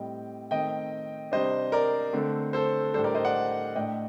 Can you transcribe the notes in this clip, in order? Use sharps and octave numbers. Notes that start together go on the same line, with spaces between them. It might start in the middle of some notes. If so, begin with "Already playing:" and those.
Already playing: A2 G3 C4 D#5 G5
D#3 A3 C4 D#5 G5
C3 G3 D4 C5 D#5
A#4 D5
D3 A3 C4
A4 C5
A2 G3 D4 A4 C5
A#4 D5
C5 D#5
D5 F#5
A2 A3 D4 D#5 G5